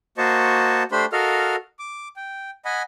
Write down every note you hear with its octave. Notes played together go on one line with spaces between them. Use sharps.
A#3 F#4 C5 D#5 A5 C#6
A3 D4 G4 C5 B5 C6
F#4 A4 A#4 D#5 F5 F6
D6
G5
D#5 F#5 G#5 B5